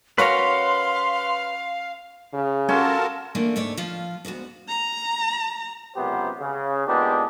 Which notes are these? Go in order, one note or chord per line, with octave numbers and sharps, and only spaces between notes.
C#4 F#4 A#4 B4 C#5 F5 C6
C#3
C#4 F4 F#4 A4 A#4 A5
E3 A3 A#3 D4
D2 G#2 A3 C#5 D5
F3 F4
D2 G#2 B3 F#4
A#5
C#2 F#2 C3 B3 G4 C5
C#3
A#2 G#3 B3 D4 D#4 G4